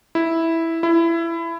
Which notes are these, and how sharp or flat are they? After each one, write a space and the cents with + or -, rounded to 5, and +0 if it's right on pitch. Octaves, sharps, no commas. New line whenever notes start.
E4 -5
E4 +20